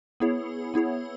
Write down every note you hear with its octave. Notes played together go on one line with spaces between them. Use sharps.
B3 E4 G#4 C#5
B3 E4 G#4 C#5